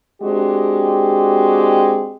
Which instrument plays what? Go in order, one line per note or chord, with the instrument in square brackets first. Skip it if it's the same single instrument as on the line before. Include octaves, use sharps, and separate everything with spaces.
[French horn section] G#3 C4 D4 F#4 G4